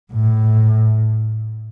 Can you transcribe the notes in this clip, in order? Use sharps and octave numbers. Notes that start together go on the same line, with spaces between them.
A2